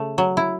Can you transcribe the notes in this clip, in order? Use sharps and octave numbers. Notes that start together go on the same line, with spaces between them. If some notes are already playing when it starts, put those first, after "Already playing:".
Already playing: C#3 A3
F#3
E4